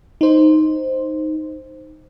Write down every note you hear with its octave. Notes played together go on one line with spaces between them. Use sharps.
D#4 C5